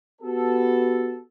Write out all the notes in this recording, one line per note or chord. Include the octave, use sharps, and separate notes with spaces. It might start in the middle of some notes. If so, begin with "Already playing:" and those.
B3 F#4 G4 A4